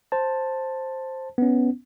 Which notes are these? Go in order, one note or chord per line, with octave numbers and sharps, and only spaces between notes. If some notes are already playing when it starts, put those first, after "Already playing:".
C5 A5
B3 C#4